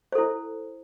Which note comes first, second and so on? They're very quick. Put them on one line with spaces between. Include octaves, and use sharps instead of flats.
C5 A4 E4